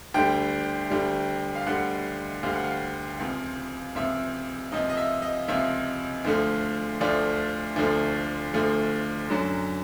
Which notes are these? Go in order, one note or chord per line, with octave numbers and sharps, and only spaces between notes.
D2 D3 G3 G5
D2 D3 G3
F5
D2 D3 G3 F#5
D2 D3 G3 F5
F#5
F5
C#2 C3 F3
C#2 C3 F3 E5
C#2 C3 F3 D#5
D#5
E5
D#5
C#2 C3 F3 E5
D2 D3 F3 A3
D2 D3 F3 A3 D5
D2 D3 F3 A3
D2 D3 F3 A3
F#2 D3 F#3